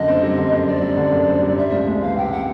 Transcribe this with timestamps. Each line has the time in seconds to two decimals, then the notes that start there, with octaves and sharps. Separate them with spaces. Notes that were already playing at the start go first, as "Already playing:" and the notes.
Already playing: F#2 D3 D#5
0.08 C4
0.23 G3
0.38 D3
0.53 F#2
0.67 C4 D5
0.83 G3
0.97 D3
1.12 F#2
1.27 C4
1.43 G3
1.57 C3 E5
1.72 C#2
1.87 G#3
2.02 E3 F5
2.17 C3 G5
2.32 F#5